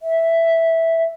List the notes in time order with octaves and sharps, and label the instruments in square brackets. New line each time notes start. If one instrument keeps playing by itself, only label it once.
[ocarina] E5